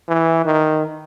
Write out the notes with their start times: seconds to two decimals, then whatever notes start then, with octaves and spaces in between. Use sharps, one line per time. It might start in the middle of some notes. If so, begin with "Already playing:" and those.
0.08 E3
0.45 D#3